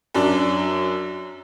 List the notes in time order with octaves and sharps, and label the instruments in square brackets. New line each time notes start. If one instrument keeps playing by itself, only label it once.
[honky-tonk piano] F#2 F#3 D4